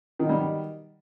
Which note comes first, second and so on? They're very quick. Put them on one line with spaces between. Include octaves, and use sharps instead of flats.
D#3 B2 G3